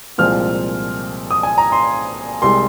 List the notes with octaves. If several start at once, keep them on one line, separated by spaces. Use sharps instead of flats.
C2 A#2 F3 G#3 C4 F6
D#6
G#5
A#5
C6
C2 C3 G#3 C6